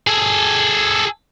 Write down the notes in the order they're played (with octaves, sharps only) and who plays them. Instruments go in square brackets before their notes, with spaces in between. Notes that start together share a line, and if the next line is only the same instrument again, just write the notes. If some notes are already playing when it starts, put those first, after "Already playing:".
[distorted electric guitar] G#4 A4